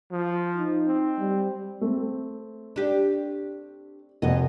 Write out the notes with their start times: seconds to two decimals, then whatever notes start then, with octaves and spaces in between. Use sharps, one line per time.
0.12 F3
0.56 D#4
0.87 C4
1.19 G3
1.81 A3 C4
2.76 D4 G4
4.22 F1 F2 D#5 F#5